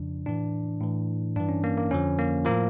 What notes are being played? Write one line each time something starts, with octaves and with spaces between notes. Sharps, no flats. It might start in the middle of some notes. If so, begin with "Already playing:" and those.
Already playing: F2 C#3 F3 D4
A2 E3 D4
A2 E3
G2 E3 D4
C#4
A#3
A#3
F2 D3 F3 C#4
A#3
A2 F3 A#3